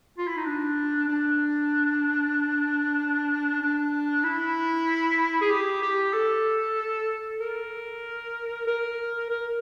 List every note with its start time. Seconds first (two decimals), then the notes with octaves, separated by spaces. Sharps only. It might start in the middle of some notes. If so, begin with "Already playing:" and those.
0.18 F4
0.27 E4
0.37 D#4
0.46 D4
1.08 D4
3.62 D4
4.24 E4
5.41 G#4
5.50 G4
5.82 G4
6.13 A4
7.41 A#4
8.67 A#4
9.30 A#4